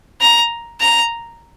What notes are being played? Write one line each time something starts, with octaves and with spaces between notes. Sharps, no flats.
A#5
A#5